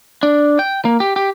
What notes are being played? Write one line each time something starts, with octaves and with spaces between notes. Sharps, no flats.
D4
G5
A#3
G4
G4